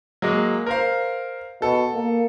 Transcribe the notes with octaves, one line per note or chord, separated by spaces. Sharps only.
F#3 G#3 A#3
A#4 C5 F5
B2 A4
A#3